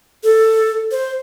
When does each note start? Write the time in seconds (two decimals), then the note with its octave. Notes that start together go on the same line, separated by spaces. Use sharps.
0.24 A4
0.91 C5